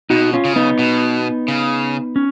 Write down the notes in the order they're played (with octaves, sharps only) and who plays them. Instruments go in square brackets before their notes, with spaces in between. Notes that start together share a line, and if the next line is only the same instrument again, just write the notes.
[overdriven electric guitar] B2 [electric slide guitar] D#4 F#4
[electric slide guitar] C#4 F4
[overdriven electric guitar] C#3
[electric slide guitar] B3 D#4
[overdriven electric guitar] B2
C#3
[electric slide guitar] C#4